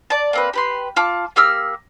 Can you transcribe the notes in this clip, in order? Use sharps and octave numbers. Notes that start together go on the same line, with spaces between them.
D5 A5
A#3 C4 B4
G4 B4 C6
F4 A5 D6
A#3 G4 E6 F6